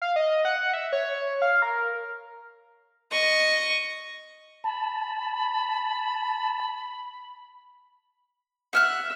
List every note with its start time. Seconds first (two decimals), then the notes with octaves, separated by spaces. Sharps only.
0.02 F5
0.16 D#5
0.45 F#5
0.73 E5
0.92 C#5
1.42 F5
1.62 A#4
3.11 D#5 C#6
4.64 A5 B5
8.73 E5 F#5 F6 F#6